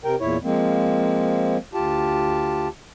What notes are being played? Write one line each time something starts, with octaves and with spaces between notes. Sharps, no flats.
C3 A#4 G5
E2 A#2 E4 C#5
F3 G#3 A#3 C4
D2 F4 G4 A5